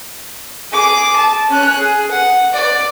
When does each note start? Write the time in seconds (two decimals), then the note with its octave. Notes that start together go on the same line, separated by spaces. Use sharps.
0.72 G#4 D6
1.16 A5
1.50 C#4 F#6
1.78 G#4
2.11 F#5
2.53 D5